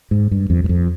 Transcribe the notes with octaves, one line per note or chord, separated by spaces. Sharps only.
G#2
G2
F2
G2
F2